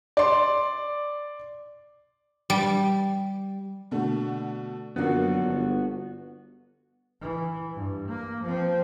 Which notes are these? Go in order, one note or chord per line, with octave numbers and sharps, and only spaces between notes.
D5 C6
G3
B2 D3 A3
F#2 D3 F3 A#3 B3 F#4
G1
E3
G2
A#3
F3 C4